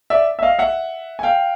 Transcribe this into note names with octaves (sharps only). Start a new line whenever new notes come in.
D5 E5
E5
D#5 F5
E5 F#5
G#5
F5 G5